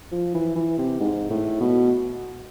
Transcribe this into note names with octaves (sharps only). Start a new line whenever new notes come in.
F3
E3
E3
C3
G#2
A2
B2